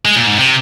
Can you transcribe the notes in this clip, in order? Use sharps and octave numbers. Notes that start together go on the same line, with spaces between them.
G#3
A#2
G#2
C3